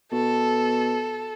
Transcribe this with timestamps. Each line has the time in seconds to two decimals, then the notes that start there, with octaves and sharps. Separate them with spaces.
0.12 B2 A4